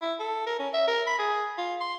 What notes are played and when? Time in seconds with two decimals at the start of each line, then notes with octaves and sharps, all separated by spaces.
0.02 E4
0.20 A4
0.47 A#4
0.59 C#4
0.73 E5
0.88 A#4
1.07 B5
1.19 G#4
1.58 F4
1.81 C6